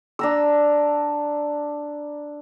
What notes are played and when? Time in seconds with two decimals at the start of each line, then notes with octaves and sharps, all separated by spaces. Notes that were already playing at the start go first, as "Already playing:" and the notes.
0.19 D4 A#5 E6